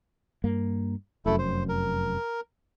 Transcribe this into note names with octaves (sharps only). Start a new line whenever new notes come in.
G2 A#3
F1 F#2 A3 E4 A4
C5
A#4